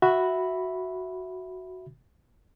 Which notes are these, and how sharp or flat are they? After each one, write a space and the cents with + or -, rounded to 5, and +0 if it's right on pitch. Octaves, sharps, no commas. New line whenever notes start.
F#4 +0 E5 +0 B5 +0